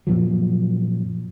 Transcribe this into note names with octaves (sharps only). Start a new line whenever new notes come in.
F#2 A#2 F3 F#3